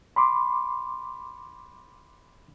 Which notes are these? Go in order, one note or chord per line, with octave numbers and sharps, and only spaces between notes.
B5 C6 D6